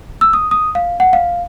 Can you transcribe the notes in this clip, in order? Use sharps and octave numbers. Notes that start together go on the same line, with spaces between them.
E6
D#6
D#6
F5
F#5
F5